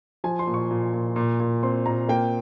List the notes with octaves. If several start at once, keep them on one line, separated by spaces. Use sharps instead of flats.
F3 G#5
C6
A#2
C#6
A#2
A#2
A#2
A#2
C4 C6
A#2 A#5
A#3 G5